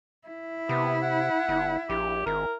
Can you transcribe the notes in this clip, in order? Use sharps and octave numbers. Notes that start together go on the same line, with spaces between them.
E4
C3 B3
F#5
G1
A#1 G4
G#1 A#4